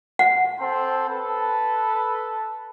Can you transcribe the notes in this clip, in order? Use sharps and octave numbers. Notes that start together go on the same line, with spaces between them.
F#5
C4 A4 C5
A4 B4